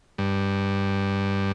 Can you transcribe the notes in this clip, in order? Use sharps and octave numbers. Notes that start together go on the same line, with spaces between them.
G2